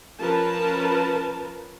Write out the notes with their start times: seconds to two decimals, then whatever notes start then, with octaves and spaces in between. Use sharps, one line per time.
0.20 F3 C#4 A#4 B4 A5